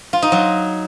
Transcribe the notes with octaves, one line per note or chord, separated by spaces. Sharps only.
F4
D#4
F#3